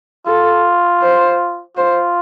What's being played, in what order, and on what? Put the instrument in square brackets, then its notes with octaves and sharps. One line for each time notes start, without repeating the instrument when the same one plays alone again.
[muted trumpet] F4 [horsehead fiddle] A4
[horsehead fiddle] C5
[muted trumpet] F4 [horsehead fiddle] C5